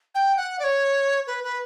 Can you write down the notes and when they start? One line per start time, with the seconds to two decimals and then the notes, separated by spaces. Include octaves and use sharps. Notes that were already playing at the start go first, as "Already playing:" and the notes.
0.15 G5
0.37 F#5
0.60 D5
0.64 C#5
1.27 B4
1.44 B4